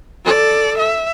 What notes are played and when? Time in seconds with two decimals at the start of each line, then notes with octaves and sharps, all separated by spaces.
0.24 A4 D5
0.78 E5